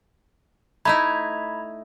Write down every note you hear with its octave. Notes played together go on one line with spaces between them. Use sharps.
A3 D#4 E4 A#5 B5 G#6